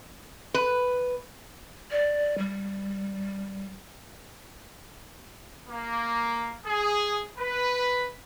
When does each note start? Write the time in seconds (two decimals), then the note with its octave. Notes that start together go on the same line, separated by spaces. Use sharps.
0.54 B4
1.91 D5
2.38 G3
5.68 A#3
6.65 G#4
7.38 B4